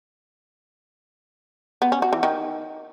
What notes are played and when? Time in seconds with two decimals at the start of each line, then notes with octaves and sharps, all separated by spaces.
1.82 B3
1.92 C#4
2.02 F#4
2.13 E3
2.23 D#3